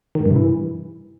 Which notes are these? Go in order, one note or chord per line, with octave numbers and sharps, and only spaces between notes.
D#3
G#2
G2
C3
E3